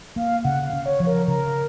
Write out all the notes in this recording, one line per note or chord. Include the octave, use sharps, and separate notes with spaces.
A#3 F5
C#3 F#5
F5
C#3
C#5
F3
A#4
C#3 A#4